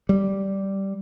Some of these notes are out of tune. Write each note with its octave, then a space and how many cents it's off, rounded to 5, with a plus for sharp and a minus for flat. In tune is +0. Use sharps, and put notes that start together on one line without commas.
G3 -10